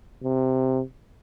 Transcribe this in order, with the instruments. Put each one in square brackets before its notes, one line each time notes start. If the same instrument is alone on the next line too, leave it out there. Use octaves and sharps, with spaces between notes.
[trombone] C3